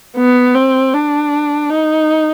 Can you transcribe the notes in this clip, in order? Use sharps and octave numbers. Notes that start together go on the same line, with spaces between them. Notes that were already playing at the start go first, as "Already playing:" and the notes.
B3
C4
D4
D#4